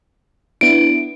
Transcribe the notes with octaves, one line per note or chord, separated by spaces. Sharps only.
B3 D4 E4 D7